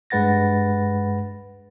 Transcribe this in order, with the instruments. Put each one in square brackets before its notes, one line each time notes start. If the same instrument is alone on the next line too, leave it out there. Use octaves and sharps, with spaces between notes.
[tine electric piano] G2 G#3 B4 F#5 A6 A#6